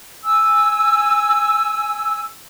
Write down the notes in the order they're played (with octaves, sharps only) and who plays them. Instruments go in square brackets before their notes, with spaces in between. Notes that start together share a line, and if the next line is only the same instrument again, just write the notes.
[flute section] G#5 E6